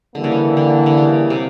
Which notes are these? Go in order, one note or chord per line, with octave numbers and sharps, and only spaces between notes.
D3 E3 G3 A#3
C#3
D3
D3
D3
C#3
C3